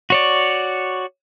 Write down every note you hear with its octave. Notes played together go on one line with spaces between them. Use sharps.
F#4 C#5 D5